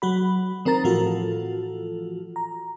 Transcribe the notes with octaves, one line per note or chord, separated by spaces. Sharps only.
F#3 F#4 B5
D#3 C4 A#4 A#5 A6
A2 E3 F3 F4 F#4 A4
A#5